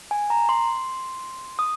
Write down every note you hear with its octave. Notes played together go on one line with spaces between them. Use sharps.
G#5
A#5
C6
D#6